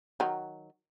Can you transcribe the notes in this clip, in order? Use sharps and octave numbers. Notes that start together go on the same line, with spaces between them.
D#3 F#3